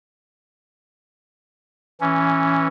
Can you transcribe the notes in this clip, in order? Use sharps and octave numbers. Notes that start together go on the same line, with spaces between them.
E3 C#4